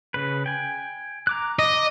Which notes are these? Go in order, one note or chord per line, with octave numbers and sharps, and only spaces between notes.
C#3 B4
G5 G#5
A#5 D6 F#6
D#5 D6